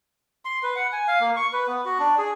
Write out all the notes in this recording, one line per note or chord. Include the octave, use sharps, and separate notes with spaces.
C6
B4
F#5
G#5
F5
A#3
C#6
B4
B3
F#4
D4
G#4